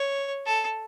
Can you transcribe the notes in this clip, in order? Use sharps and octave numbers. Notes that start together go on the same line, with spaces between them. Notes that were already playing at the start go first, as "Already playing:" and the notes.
Already playing: C#5
A4